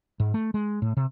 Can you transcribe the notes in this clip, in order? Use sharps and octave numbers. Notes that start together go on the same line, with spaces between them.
G#2
A3
G#3
A2
C3